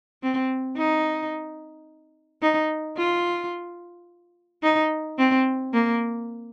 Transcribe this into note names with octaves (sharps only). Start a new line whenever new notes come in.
C4
D#4
D#4
F4
D#4
C4
A#3